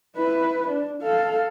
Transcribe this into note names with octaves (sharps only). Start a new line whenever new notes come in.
E4 B4
D4
A4 F5